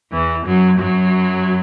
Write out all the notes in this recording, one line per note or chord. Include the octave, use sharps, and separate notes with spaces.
E2 E3
F#2 F#3
F#2 F#3